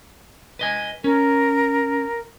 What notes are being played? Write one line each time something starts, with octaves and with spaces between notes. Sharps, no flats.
B4 D#5 G#5
C#4 A#4